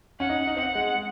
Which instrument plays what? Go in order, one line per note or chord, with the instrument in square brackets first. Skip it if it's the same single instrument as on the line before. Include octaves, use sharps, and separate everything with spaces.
[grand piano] C#4 [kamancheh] F#5
[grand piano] D#4
D#4
[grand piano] C4 [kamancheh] F#5
[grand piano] G#3